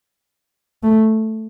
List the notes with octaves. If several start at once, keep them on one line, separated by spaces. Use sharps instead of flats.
A3